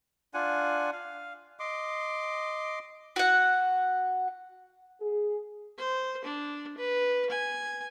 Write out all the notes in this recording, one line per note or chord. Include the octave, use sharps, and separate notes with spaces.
D4 F4 F#5 G#5
F5
D#5 C6 D6
F#4 F#5
G#4
C5
D4
B4
G#5